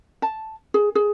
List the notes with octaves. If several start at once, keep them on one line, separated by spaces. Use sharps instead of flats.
A5
G#4
G#4